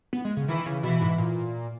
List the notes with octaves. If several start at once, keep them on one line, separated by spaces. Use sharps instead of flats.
B3
G#3
C#3
D#3 E3 E4
C#3
B2 E3 E4
G#2
A#2